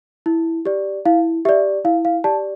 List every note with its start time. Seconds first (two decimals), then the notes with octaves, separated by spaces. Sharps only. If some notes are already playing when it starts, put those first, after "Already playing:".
0.26 E4
0.65 G4 D5
1.06 E4 F5
1.45 G4 D5 E5
1.85 E4 F5
2.05 F5
2.24 G4 D5 A5